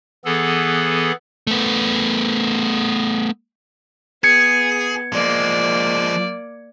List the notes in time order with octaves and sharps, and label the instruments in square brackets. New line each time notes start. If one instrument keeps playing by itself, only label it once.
[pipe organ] E3 B3 G#4 A4
[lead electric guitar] A3 B3
[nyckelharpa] B3 [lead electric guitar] G#4 [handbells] G#6 C#7
[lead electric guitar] F3 G#3 [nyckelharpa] A#3 D5